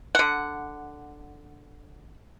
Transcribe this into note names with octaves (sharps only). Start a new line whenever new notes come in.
D3 F#5